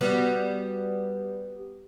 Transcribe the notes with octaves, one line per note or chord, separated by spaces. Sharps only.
G3 B3 F#4